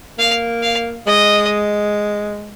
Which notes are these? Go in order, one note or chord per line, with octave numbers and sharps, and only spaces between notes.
A#3 F5
F5
G#3 D#5